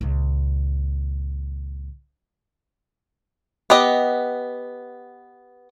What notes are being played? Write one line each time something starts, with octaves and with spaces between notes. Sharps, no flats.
C#2 A#2
B3 G4 D#5